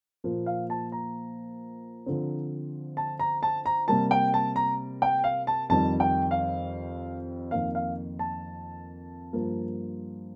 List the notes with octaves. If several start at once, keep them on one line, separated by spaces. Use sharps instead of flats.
A#2 F3 A#3
F5
A5
A#5
D3 F3 C4
A5
A#5
A5
A#5
C3 G3 A#3 A5
G5
A5
A#5
G5
F5
A5
F2 D#3 G3 C4 A5
G5
F5
F2 D#3 A#3 F5
F5
A5
G2 F3 A#3